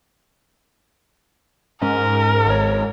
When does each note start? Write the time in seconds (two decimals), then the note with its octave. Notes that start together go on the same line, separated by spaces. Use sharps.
1.82 G#2 C#4 A#4
2.47 G#1 C#5